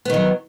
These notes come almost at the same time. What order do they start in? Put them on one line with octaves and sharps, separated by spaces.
B3 D#3 F#3